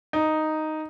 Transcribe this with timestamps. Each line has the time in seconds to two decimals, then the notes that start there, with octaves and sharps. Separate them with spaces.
0.13 D#4